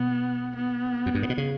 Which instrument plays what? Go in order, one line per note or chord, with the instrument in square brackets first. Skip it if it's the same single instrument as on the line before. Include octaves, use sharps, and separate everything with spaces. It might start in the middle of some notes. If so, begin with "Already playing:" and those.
Already playing: [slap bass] B2 [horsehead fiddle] B3
[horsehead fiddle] B3
[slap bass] F#2
G2
A2
B2
C#3